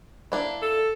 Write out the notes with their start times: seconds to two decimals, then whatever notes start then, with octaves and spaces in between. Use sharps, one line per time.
0.32 A#3 D4 E4
0.62 A4